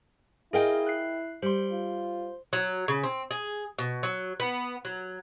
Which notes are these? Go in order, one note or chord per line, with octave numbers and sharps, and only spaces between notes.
E4 G#4 A#4 D#5 F5 G5 G#5
F#6 C7
G3 C5 C6
F4
F#3
C#3
C4
G#4
B2
F#3
B3
F#3